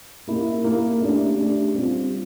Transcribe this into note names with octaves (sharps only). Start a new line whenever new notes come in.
A#3 E4 A#4
A#3 E4 A#4
A3 D4 G4 D5
A3 D4 G4 D5
G3 C4 F4